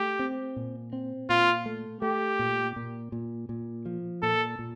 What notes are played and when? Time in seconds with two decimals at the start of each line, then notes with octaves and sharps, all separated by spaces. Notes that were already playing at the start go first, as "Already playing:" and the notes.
Already playing: A3 G4
0.19 C4
0.56 A#2
0.93 C4
1.29 A#2 F4
1.66 A3
2.02 A3 G4
2.39 A#2
2.76 A#2
3.12 A#2
3.49 A#2
3.86 F3
4.22 A#2 A4
4.59 A#2